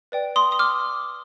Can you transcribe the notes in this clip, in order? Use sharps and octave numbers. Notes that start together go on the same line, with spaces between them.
B4 D5 G5
C6 D#6
D#6
D6 F6